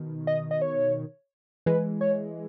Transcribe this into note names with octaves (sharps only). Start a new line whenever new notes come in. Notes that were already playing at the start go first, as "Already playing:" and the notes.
Already playing: B2 D#3
D#5
D#5
C#5
E3 G#3 B4
C#5